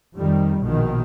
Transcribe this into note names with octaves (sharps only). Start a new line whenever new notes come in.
F2 D#3 G3
A#1 B2 D#3